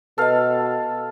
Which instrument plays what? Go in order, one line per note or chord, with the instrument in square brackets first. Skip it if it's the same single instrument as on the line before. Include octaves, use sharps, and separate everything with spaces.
[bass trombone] B2 [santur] A4 F5 [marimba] B4 D#5